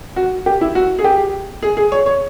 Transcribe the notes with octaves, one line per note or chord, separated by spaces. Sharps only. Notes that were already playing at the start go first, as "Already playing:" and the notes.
F#4
G4
E4
F#4
G#4
G4
G#4
G#4
C#5
C#5